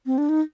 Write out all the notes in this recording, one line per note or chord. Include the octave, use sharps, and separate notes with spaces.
C4
D4
D#4